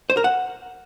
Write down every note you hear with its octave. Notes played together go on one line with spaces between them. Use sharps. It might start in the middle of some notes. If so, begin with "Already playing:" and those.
C5
A#4
F#5